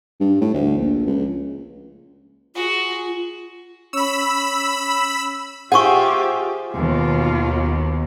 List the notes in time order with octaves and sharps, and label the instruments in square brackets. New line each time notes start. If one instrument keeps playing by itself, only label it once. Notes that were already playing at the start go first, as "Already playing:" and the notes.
[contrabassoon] G2
A2
D2
A#1
C#2
[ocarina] F4 [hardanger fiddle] F#4 G#4
[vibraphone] C#4 C#5 [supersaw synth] B5 E6
[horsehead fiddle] F4 G4 [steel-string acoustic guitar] G#4 C5 E5 [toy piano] F#5 C#6
[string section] D#2 B2 [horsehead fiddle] F4